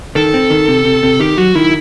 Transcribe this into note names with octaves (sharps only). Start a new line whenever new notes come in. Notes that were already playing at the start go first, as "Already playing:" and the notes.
D#3 A4
C4
D#3
C3
C3
C3
D#3 G4
F#3 F#4
D#3 E4